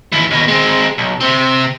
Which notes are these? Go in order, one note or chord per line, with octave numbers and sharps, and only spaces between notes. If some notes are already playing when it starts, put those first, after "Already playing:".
D#2 E3
D#2 B2
G#3 C4
B1
C3 C4